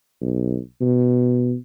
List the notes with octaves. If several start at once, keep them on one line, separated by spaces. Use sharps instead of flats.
B1
B2